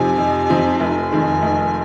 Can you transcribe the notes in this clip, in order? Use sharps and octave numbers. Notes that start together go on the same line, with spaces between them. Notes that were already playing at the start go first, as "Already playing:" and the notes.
Already playing: F2 C3 F3 C4 D#4 G#5
F2
C3 F3 C4 D#4
F1 G#5
F2 D#3 G#3
F1